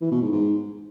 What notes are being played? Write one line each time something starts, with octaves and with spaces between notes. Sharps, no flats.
E3
B2
G#2
G#2